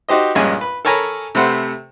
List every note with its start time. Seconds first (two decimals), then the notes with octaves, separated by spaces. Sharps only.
0.09 D#4 F#4 G4 C5 D#5
0.35 A#1 G2 G#3 C#4 G#5
0.61 B4
0.85 A4 A#4 C#5 G#5 A#5 B5
1.35 C3 A3 B4 C5 F#5